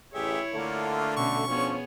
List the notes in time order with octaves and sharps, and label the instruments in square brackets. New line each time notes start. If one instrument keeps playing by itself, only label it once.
[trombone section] A1 G#4 [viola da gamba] E4 C#5 [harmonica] G4 E5
[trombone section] D3 A3 [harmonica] A#3 F4
[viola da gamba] B2 C#4 [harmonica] C#6
[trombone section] F3 C#4 D4 [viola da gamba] B3 G#4 C#5